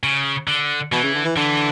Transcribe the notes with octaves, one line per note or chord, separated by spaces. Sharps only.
C#3
D3
B2 E3
C#3
D3
E3
D3 E3